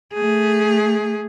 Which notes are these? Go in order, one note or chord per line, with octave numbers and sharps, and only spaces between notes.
A3 G#4